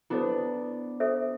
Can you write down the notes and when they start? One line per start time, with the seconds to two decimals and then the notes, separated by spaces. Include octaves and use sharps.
0.10 B3 D4 E4 A4 C5
1.00 A4 C5 E5